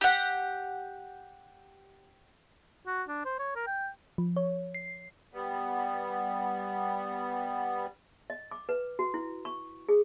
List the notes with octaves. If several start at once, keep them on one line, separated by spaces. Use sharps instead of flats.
G4 F#5
F#4
D4
C5
C#5
A#4
G5
F3
C#5
C7
G3 B3
D#5
D6
B4
F#4
E4
C#6
G#4